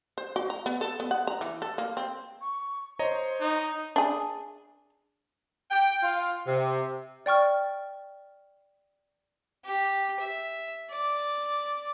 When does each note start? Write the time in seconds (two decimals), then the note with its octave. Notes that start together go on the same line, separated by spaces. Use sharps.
0.18 C5
0.36 F#4
0.50 A#5
0.66 B3
0.81 A4
1.00 B3
1.11 F#5
1.27 A#5
1.41 E3
1.62 A4
1.78 A#3
1.97 C4
2.41 C#6
2.99 C5 C#5 D#5 A#5
3.40 D#4
3.96 D4 G#4
5.71 G5
6.03 F4
6.46 C3
7.26 D5 G5 C#6 F6
9.65 G4
10.20 E5
10.91 D5